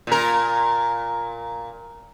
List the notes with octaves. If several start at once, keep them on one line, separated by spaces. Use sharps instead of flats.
A#2 A#4